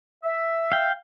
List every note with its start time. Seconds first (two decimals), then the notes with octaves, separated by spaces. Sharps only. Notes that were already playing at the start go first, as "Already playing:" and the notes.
0.24 E5
0.72 F5 G5